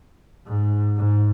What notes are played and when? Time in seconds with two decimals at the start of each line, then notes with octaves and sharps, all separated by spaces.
0.47 G#2
0.98 G#2